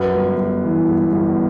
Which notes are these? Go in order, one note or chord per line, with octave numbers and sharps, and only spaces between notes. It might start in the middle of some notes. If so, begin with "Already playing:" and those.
Already playing: F#2 B4
G1
G1
E3
G1
G1